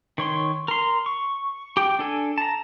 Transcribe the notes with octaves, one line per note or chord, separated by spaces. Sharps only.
D#3 C#5 C6
A#4 C6
C#6
G4 G5
D4 A4 G#5
A5 A#5